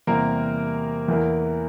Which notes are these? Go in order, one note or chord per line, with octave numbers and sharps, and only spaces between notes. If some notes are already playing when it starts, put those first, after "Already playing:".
E2 C3 G3 A#3 C4 A#4
E2 E3 A#3